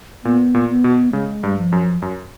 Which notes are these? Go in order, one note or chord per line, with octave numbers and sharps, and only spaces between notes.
A#2 B3
A#2
B3
B2
C#3 G#3
G2
F3
F#2
F#2